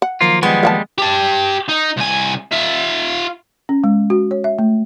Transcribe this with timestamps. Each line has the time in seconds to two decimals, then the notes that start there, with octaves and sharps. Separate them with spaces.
0.02 F#5
0.21 D#3 F3 F#3 A#3 F4
0.43 G3 G#3 B3
0.63 A#3 F#5 A5
0.98 G4 A5
1.69 D#4
1.97 C2 G#5
2.52 F4 E5
3.69 C#4
3.84 G#3
4.10 F#4
4.31 C#5
4.44 E5
4.59 A3